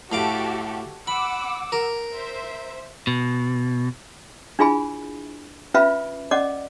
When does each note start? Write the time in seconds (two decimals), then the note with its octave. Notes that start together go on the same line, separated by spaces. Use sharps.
0.12 A2 F#4 G4 A4 F5 D6
1.07 F#5 B5 D6 E6
1.72 A#4
2.13 C5 E5
3.07 B2
4.59 D4 E4 F4 G#4 G#5 B5
5.74 C#4 F4 B4 E5 F5 B5
6.31 C#4 D5 D#5 F#5 D6